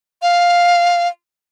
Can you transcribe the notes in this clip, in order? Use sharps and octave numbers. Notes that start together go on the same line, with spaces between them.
F5